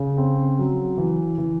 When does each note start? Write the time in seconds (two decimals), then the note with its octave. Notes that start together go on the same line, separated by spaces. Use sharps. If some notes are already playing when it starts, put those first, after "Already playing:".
Already playing: C#3
0.17 C4
0.59 F#3
0.98 E3
1.38 E3